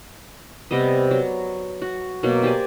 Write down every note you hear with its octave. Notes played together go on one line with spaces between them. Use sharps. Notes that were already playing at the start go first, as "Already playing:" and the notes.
C3 G3 B3 D#5
F#3
F#4
B2 F#3 A#3
G4 C5 D5 G#5